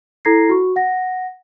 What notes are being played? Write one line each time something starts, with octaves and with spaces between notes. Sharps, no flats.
E4 A4 A#5 G#6 A#6 C7
F#4 C#6
F#5 A#6